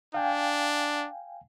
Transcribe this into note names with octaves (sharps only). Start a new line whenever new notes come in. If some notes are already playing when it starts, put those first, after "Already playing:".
D4 F5 G5 G#5